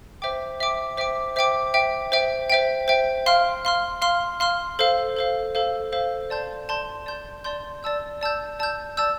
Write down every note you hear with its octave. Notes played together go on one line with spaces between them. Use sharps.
C5 E5 G5 D6
C5 E5 G5 D6
C5 E5 G5 D6
C5 E5 G5 D6
C5 E5 G5
C5 E5 G5
C5 E5 G5
C5 E5 G5
F5 C6 F6
F5 C6 F6
F5 C6 F6
F5 C6 F6
A4 C5 F5
A4 C5 F5
A4 C5 F5
A4 C5 F5
D5 A5 C6 G6
D5 A5 C6 G6
D5 A5 C6 G6
D5 A5 C6 G6
D5 A5 E6 G6
D5 A5 E6 G6
D5 A5 E6 G6
D5 A5 E6 G6